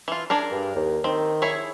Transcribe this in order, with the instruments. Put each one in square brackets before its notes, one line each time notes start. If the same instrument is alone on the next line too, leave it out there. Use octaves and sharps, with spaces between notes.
[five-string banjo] E3 F4
D4 G#4 A#4
[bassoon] G2
D#2
[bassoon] D#3 [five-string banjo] C4
[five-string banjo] E4 G#4 C#5